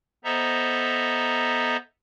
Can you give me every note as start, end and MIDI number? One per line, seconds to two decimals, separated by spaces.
0.24 1.77 59
0.24 1.77 69
0.24 1.77 72
0.24 1.77 75
0.24 1.77 76
0.24 1.77 82